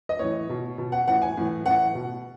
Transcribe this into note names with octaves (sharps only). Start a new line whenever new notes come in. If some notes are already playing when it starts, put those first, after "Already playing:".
D#5
A2 E3 C#5
B2
B2
F#5
A2 E3 F#5
G#5
A2 E3
A2 E3 F#5
B2